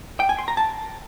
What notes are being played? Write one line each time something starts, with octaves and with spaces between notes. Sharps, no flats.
G5
G#5
C6
A#5
A5